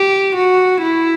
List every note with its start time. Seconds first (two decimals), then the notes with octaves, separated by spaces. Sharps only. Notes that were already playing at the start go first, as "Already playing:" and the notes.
Already playing: G4
0.35 F#4
0.82 E4